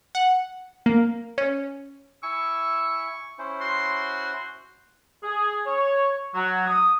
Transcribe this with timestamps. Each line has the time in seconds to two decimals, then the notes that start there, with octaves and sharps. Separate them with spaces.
0.15 F#5
0.86 A#3
1.38 C#4
2.23 E4 G#5 C#6 E6
3.39 C#4 E4 C5
3.61 F#4 C6
5.23 G#4
5.66 C#5
6.35 F#3
6.68 D#6